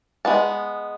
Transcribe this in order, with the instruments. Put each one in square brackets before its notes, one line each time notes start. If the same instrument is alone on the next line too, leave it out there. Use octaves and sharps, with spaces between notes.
[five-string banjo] G#3 B3 A5